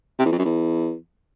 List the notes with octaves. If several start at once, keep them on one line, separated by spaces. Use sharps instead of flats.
C3
E2
F2
F#2
E2